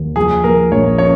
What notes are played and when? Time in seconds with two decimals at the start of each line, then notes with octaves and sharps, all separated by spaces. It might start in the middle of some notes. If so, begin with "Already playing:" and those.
Already playing: D#2
0.16 F3 G#4
0.44 F3 A#4
0.71 A#1 C#5
0.98 C#4 C#5